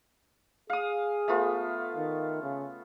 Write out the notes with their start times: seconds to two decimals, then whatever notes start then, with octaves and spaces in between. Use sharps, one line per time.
0.70 G#4 F5 D#6
1.28 A3 B3 F4
1.97 D#3
2.43 C#3